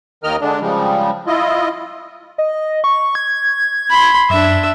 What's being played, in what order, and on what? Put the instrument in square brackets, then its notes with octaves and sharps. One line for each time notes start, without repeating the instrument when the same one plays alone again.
[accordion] D#2 D#3 A#4 D#5 F6
D3 G#3 D4
C#3 F3 G3 G#3
E4 F4 D#5
[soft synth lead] D#5
C#6
G#6
[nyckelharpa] B5 C6
[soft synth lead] F#2 [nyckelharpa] D4 E5